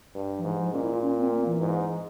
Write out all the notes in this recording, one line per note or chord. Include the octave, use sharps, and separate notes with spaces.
G2
F3
G#2 E3
F3
A#2 C#4
E4
F4
C#4
C4
A#3
E3
G#2